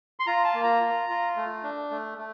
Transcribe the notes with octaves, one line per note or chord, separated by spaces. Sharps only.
C6
F4 A#5
A5
A#3
A#5
F4
F4
A3
D4
A3
A3